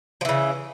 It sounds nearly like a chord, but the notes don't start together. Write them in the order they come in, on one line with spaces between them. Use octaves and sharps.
F3 E3 C#3